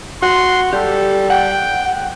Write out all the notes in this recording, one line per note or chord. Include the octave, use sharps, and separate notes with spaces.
F#4 C6
G3 G4 A4
F#5 G5